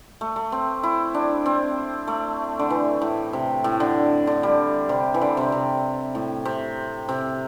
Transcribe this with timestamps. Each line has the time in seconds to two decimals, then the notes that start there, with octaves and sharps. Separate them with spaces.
0.21 A3
0.36 A3
0.52 C4
0.83 E4
1.14 D4
1.46 C4
2.07 A3
2.59 D3
2.70 E3
3.01 A2
3.33 C3
3.64 A2
3.80 D3
4.27 D3
4.43 G3
4.89 C3
5.14 E3
5.22 D3
5.37 C3
5.52 C3
6.15 A2
6.45 C3
7.09 C3